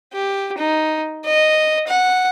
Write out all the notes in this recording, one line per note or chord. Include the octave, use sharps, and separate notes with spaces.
G4
D#4
D#5
F#5